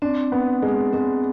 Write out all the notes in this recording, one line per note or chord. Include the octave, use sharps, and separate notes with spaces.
C4 D4
B3
G#3
G#3 C4